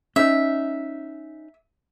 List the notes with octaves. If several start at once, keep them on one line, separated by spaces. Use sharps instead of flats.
C#4 D#4 E5